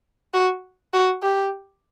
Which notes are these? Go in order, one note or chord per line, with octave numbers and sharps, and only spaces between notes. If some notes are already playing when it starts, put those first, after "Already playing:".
F#4
F#4
G4